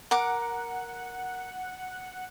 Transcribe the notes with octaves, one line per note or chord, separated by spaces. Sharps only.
A#4 F#5 D6